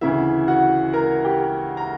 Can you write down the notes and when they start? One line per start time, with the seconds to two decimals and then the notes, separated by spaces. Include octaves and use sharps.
0.01 D2 C#3 E3 E4 E5
0.48 F#4 F#5
0.93 A#4 A#5
1.24 G4 G5
1.77 A#5